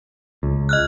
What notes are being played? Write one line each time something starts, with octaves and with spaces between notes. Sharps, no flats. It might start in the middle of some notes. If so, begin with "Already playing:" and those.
C#2
D#5 F6 F#6